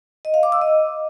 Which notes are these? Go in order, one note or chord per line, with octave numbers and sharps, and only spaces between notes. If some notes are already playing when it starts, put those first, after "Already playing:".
D#5
F5
D6
E6
D#5